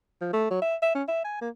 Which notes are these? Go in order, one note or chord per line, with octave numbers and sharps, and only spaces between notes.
F3
A3
F#3
E5
E5
C#4
E5
G#5
A#3